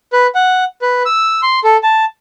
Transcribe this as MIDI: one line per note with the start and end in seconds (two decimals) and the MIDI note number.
0.13 0.27 71
0.35 0.64 78
0.82 1.03 71
1.06 1.41 88
1.43 1.60 84
1.64 1.77 69
1.83 2.05 81